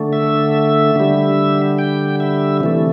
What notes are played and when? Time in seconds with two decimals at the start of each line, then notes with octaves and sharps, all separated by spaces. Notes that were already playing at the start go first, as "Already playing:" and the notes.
Already playing: D3 A3
0.13 E5
0.96 D3 G3
1.78 G5
2.20 E5
2.60 C3 E3 A3